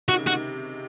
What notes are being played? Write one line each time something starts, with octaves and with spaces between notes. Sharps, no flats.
C3 D#3 F#4
C#3
C3 D#3 F#4